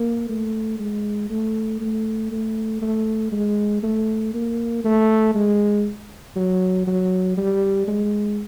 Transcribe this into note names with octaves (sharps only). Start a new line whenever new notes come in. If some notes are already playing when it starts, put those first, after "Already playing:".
Already playing: A#3
A3
G#3
A3
A3
A3
A3
G#3
A3
A#3
A3
G#3
F#3
F#3
G3
G#3